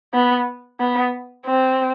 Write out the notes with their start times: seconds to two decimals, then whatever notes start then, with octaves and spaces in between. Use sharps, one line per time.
0.14 B3
0.80 B3
1.46 C4